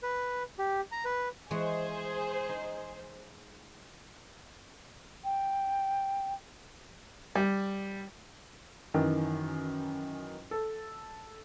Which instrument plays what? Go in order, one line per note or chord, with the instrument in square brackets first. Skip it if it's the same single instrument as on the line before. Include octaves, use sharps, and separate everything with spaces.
[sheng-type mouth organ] B4
G4
A#5
B4
[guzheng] E3 G#3 C#5 [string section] G#4 C5
[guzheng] D#4
[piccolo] G5
[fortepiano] G3
[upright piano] F#2 D#3 E3
A4